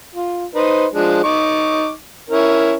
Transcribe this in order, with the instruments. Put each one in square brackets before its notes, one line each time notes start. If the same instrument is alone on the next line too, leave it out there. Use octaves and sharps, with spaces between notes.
[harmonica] F4
D#4 B4 C5
F3 G#3 D4
D#4 C#6 D6
C#4 E4 A#4